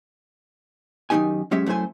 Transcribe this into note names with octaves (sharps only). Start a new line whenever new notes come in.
F#2 D#3 G#3 D#4 G4 G#5
F#3 G#3 C#4 G4 E5
F#2 A3 E4 C5 G#5